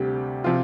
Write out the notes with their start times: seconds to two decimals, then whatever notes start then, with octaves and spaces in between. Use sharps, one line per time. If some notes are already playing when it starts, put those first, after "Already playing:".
Already playing: D2 C3 G3 G4
0.44 C3 F3 F4